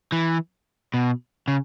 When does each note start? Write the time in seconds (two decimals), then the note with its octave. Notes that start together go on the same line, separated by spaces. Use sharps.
0.12 E3
0.94 B2
1.48 C#3